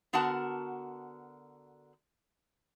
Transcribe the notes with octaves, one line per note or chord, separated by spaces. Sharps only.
D3 B3 F#4 A#4 F#5 A5